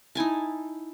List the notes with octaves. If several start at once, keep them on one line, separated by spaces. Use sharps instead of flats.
D#4 E4 G#5 A5